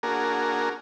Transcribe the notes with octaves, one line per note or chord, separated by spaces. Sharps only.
A#3 D4 F#4 G#4 A#4